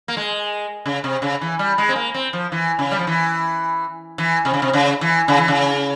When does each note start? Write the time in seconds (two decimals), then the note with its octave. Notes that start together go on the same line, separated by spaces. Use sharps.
0.08 A#3
0.17 G#3
0.86 C#3
1.04 C3
1.22 C#3
1.41 E3
1.59 G3
1.78 G#3
1.89 C4
1.96 A#3
2.14 C4
2.33 F3
2.52 E3
2.79 C#3
2.91 G3
2.99 F3
3.07 E3
4.18 E3
4.45 C3
4.53 C#3
4.62 C3
4.73 C#3
5.01 E3
5.28 C#3
5.38 E3
5.48 C#3